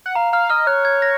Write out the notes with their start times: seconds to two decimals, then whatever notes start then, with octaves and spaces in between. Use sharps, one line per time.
0.06 F#5
0.15 F5 A#5
0.33 F5 F6
0.50 D#5 F6
0.67 C#5 F#6
0.85 G#6
1.02 A#6